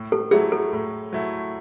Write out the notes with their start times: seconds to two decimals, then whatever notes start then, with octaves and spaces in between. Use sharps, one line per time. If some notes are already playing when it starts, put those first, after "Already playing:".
Already playing: A2
0.12 A4
0.31 F#3 A3 E4 G#4
0.52 A4
0.73 A2
1.13 F#3 A3 E4